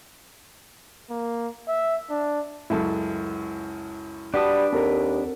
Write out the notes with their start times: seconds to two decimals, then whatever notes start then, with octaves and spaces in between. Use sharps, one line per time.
1.10 A#3
1.68 E5
2.10 D4
2.70 C#2 F#2 E4 A4
4.34 G3 D4 F#4 B4 A5 D#6
4.73 D#2 C4 F#4 A4 A#4